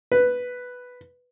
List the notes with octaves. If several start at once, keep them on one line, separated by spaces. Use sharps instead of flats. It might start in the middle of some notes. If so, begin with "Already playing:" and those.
B4